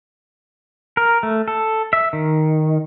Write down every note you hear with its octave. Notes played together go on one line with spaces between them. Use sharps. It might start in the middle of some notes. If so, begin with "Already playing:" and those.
A#4
A3
A4
E5
D#3